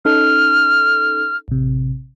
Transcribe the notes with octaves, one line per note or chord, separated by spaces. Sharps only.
C#4 D#4 A4 F6
A1 C3